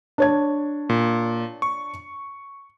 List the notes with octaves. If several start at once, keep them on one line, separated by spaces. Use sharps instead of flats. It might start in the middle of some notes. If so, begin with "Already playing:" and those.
D4 C#5 G#6
A#2
C#6